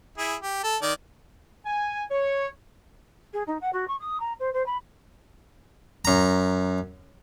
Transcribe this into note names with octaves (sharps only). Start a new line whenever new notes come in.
E4 G#4
G4
A4
D#3 D5
G#5
C#5
G#4
D#4
F#5
F#4
C#6
D#6
A#5
C5
C5
B5
F#2 A#5